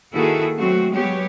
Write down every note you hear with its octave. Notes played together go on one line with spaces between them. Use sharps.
D#3 A#3 E4 F#4 G#4 A4
F#3 A3 C4 F#4
F#3 G#3 B3 G4 C#5